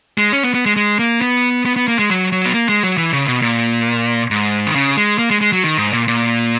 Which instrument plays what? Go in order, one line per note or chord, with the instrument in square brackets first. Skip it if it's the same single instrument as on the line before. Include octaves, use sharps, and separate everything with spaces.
[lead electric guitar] G#3
C#4
B3
B3
G#3
G#3
A#3
B3
B3
B3
A#3
G#3
F#3
F#3
B3
A#3
G#3
F#3
E3
C#3
B2
A#2
G#2
D#3
C#3
G#3
A#3
G#3
G#3
F#3
D#3
G#2
A#2
A#2